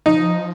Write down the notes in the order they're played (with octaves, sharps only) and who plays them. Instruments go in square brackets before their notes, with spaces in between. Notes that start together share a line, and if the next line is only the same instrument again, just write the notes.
[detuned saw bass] F3 [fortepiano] D#4